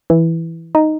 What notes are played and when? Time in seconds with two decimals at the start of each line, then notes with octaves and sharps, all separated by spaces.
0.10 E3
0.75 D#4